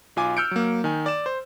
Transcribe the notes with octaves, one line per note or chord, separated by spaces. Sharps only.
B1 F4 G#5 D6
E6 F6 G6 C#7 D7
F#3 A#3
D#3 G#5
D5 E7
C5